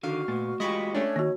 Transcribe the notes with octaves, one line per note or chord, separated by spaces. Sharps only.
D3 D#3 F#4 F5
A#2 A3 B3
G#3 F4 G4 D#5 B5 C#6
A3 C#4 D4 C#5
D#3 A#3 F#4